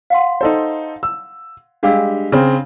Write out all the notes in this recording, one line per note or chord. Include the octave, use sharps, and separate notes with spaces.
F5 F#5 C6
D#4 A4 C5
E6
G3 G#3 D4 G4 F5 E6
C#3 C4